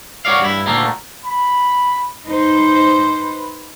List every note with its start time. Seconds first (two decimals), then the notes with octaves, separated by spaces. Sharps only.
0.25 F#4 C#5 D5 F5
0.40 G2 E4
0.66 D2 A#2 D#3 A3 A#3
1.25 B5
2.26 D#4 B4 C5